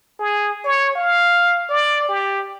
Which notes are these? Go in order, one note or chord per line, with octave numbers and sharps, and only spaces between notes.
G#4
C#5
F5
D5
G4